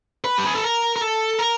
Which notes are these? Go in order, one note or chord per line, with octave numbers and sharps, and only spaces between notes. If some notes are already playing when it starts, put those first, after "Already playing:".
B4
G4
G#4
A4
A#4
A#4
A4
A#4